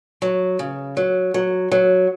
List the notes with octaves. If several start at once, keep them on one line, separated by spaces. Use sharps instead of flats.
F#3
C#3
F#3
F#3
F#3